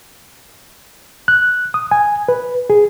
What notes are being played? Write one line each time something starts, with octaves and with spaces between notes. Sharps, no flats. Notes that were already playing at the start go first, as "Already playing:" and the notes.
F#6
D#6
G#5
B4
G#4